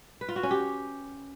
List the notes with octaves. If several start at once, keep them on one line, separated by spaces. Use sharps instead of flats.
B4
F4
F#4
C#4
G4